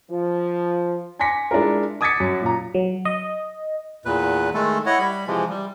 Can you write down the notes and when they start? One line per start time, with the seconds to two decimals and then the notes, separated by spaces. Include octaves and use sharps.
0.10 F3
1.19 G#5 C6 D6 A#6 B6 C#7
1.51 G#3 D4 E4 F4 A#4
2.01 D6 D#6 G#6 A6 B6 C#7
2.20 F#2
2.42 A#2 A#5
2.74 F#3
3.05 D#5
4.05 E2 A#2 B4
4.54 D#3 G#3 A3 A4
4.86 E4 C#5 D#5 F#5
4.99 G3 B5
5.27 C3 E3 F3 G#3
5.50 G3